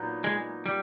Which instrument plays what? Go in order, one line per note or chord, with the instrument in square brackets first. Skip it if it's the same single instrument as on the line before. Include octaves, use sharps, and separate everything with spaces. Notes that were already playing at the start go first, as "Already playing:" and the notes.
Already playing: [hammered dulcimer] A#2 F#3 B3 D#4
[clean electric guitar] G#3
G3